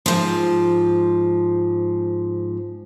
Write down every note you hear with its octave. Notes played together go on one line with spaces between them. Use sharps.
G#2 F3